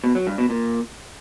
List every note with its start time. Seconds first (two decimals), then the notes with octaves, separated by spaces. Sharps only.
0.04 B2
0.15 F#3
0.27 G2
0.38 B2
0.50 A#2